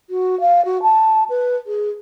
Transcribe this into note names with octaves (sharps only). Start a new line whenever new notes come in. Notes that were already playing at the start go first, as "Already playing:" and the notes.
F#4
F5
F#4
A5
B4
G#4